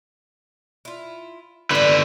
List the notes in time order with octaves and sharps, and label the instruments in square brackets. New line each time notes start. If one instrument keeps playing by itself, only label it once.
[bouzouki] E4 F4
[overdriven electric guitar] D3 B4 [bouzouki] C4 D4